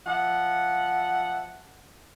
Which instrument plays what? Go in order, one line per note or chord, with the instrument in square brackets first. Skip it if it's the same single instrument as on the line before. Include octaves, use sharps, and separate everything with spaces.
[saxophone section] F3 E5 F#5